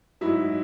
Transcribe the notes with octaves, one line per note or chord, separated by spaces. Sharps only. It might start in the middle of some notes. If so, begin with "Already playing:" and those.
G#2 F#3 E4